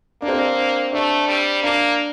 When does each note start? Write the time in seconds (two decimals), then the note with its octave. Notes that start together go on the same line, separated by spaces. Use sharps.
0.22 A#3 D4
0.28 C4
0.35 D4
0.92 A3 D4
1.28 G3
1.63 A#3 D4